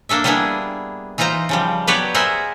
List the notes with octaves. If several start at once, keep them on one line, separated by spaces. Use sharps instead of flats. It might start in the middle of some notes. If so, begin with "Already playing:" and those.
A#3 D4 A4 E5
G3 A#3 B3 D4 E4 G#4
E3 D#4 F4 C5 A#5
C#3 F3 G3
F#3 B3 G4 B4 C#5 D5
G#4 A#4 C5 E5 F#5